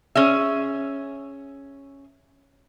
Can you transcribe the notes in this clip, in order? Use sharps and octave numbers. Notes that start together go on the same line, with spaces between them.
C#4 G#4 E5